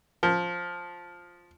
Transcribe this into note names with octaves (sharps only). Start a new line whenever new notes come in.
F3